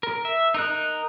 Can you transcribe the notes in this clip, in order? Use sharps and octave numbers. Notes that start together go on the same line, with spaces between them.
A#4
E5
D#4 A#4 F#6